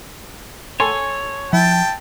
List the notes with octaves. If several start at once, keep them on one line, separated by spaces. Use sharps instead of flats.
A4 C#5 G#5 C6
F3 E4 G5 A5